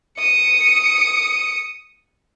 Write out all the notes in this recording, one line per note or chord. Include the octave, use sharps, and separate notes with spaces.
D#6 C#7